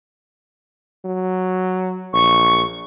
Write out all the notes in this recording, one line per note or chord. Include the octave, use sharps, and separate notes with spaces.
F#3
A#1 C#6